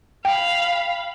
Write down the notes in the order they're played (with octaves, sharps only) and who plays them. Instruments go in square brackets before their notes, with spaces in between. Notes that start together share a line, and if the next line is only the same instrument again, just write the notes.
[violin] F5 B5 [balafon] G5